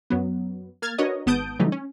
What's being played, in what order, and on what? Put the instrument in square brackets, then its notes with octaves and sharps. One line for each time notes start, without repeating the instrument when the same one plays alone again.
[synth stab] F#2 F#3 B3
A#3 F6 G#6 A6
D4 F#4 A#4 B4 C#5 D#5
G#1 B3 A5 D#6 G6 D7
C#3 E3 F#3 G3 A3 D#4
C#4